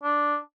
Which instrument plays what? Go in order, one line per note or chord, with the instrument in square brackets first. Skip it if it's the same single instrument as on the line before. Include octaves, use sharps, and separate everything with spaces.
[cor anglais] D4